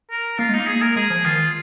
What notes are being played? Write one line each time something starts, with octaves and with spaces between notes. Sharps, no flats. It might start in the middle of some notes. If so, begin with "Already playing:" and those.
A#4
A#3 F4
G#3 D#4
A#3
G#4
A#4
G#3 G#4
F3
D#3 F4